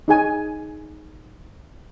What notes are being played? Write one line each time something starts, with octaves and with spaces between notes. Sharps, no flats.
D#4 G#4 G#5